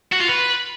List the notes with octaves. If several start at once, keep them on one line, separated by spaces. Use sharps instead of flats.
F#4
F4
B4